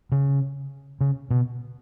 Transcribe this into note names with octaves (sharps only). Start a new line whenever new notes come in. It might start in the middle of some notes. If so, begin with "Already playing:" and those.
C#3
C#3
B2